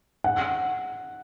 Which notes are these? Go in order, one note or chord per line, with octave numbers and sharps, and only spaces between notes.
F#5